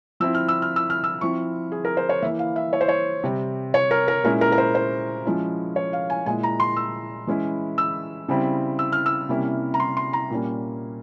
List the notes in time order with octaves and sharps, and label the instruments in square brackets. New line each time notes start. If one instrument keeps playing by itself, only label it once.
[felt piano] F3 C4 E4 E6
F6
E6
F6
E6
F6
E6
F3 C4 E4 C#6
G#4
A#4
C5
C#5
E3 A#3 E4 E5
F5
E5
C#5
C5
C#5
C3 G3 C4
C#5
A#4
A#4
A#2 G#3 C#4 E4 A#4
A#4
A#4
C5
C5
F3 G#3 C#4 E4
C#5
F5
G#5
A#2 G#3 E4 G#5
A#5
C6
E6
E3 G#3 C#4 E4
E6
C#3 G3 C4 E4
E6
F6
E6
C3 G3 A#3 C#4 E4
A#5
C6
C6
A#5
A#2 G3 A#3 C#4